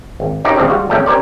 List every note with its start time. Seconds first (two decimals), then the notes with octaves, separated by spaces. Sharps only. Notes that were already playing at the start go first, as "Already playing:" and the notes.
0.20 G#1
0.45 C#4 D#4 F#4 G4 A#4
0.56 D#2 C#3 F3 F#3 C4 D4
0.68 G3 G#3 F4 F#4
0.89 G#1 F2 G#3 A3 C#4 G5
1.06 C#4 G4 A#4 C5 D5